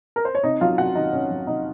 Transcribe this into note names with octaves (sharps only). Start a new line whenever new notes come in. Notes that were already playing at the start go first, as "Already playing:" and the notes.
A#4
C5
C#5
C3 D#4 D#5
F#3 F4 F5
C3 F#4 F#5
D#3 D#4 D#5
C3 C#4 C#5
F#3
C3 D#4 D#5